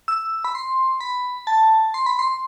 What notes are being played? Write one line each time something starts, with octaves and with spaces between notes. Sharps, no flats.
E6
B5
C6
B5
A5
C6
B5
C6